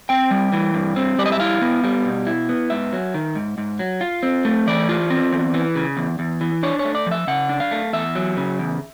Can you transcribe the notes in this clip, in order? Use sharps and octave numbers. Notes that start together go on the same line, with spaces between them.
C4 G5
G3
E3
G2
C4
G3 D5
D#5
E5
E4 F5
B3
G3
B2
E4
B3
G#2 E5
F#3
D#3
G#2
G#2
F#3
F4
C4
A3
E3 D5
F4
C4
E2
E3
C#3
E2
E2
E3
D4 C#5
C#5
A3
D5
F3
E5
C#3 F#5
D4
F5
A3
E2 E5
F#3
C#3
E2